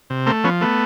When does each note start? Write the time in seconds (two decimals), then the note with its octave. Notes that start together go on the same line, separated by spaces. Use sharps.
0.10 C3
0.26 A3 A#3 C4
0.44 F3 B3 C#4
0.61 A3 B3